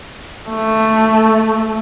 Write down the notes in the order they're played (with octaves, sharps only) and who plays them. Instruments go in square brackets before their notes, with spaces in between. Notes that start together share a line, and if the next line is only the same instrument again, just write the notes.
[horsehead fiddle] A3